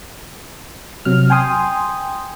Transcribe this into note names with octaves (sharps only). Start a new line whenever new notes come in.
C3 F#3 F6
G5 G#5 C6 D#6